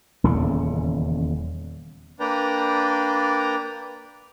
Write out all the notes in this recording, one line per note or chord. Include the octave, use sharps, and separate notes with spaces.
D#1 E2 C#3
A#3 D4 B4 D5 G5 A#5